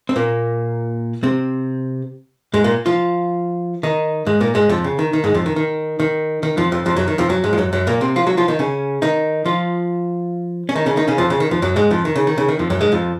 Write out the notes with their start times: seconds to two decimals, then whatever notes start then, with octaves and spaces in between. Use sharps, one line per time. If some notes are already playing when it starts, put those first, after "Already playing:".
0.09 C4
0.16 A#2 A#3
1.23 C3 C4
2.54 G#2 G#3
2.64 A#2 A#3
2.86 F3 F4
3.83 D#3 D#4
4.26 G#2 G#3
4.41 A#2 A#3
4.55 G#2 G#3
4.69 F2 F3
4.84 C#3
4.99 D#3
5.13 D#3
5.24 G#2 G#3
5.34 F2 F3
5.46 D#3
5.56 D#3
6.00 D#3
6.43 D#3
6.57 F2 F3
6.72 F2 F3
6.86 F2 F3
6.96 F#2 F#3
7.08 D#3
7.18 F2 F3
7.29 F#2 F#3
7.44 G#2 G#3
7.53 F3
7.58 F#2 F#3
7.73 F#2 F#3
7.87 A#2 A#3
8.01 C3 C4
8.16 F3 F4
8.27 F#3 F#4
8.37 F3 F4
8.48 D#3 D#4
8.59 C#3 C#4
9.02 D#3 D#4
9.46 F3 F4
10.69 C#4
10.75 D#3 D#4
10.86 C#3 C#4
10.97 D#3 D#4
11.08 C#3 C#4
11.18 F2 F3
11.30 C#3
11.40 D#3
11.51 F2 F3
11.62 F#2 F#3
11.76 G#2 G#3
11.91 F2 F3
12.05 D#3
12.16 C#3
12.27 D#3
12.38 C#3
12.48 D#3
12.59 F2 F3
12.70 F#2 F#3
12.81 G#2 G#3
12.92 F2 F3